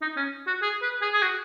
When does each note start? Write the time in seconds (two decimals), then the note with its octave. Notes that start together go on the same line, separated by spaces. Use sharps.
0.02 D#4
0.17 C#4
0.47 F#4
0.62 G#4
0.82 B4
1.02 G#4
1.13 G#4
1.22 F#4